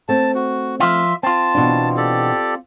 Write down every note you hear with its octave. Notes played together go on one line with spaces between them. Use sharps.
A3 C4 A5
F#4
F3 F4 E5
C4 F4 A5
B2 E3 D4
G4 A4 D5